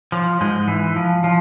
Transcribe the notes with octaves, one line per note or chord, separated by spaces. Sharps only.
F3
G#2 G#3
E3
F3
F3